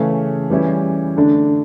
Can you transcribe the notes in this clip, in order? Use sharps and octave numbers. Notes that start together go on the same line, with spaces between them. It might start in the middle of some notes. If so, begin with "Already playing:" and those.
Already playing: C#3 E3 A3 C#4
E3 G3 C#4 E4
D3 A3 D4